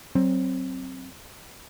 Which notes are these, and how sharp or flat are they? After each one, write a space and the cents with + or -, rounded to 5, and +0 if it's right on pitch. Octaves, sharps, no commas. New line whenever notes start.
F#3 +25 C4 +10